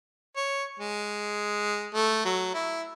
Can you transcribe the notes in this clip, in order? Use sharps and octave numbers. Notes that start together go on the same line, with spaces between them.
C#5
G#3
A3
F#3
E4